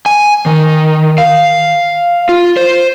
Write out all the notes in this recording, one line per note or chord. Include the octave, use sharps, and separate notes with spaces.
G#5
D#3
F5
F4
C5